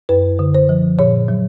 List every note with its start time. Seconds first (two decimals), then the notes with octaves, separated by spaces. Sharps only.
0.09 F#2 B4
0.39 D3
0.55 C5
0.69 F3
0.99 A#2 C#5
1.28 F#3